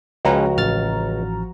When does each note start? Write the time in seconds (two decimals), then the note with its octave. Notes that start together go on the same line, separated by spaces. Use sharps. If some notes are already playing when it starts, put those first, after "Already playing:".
0.25 C#2 F3 G#3 C#4 F#4 B4 G5 A#5
0.57 A1 F6 A6